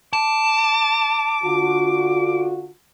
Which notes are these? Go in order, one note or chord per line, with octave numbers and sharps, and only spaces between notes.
A5 D6
D3 F4 F#4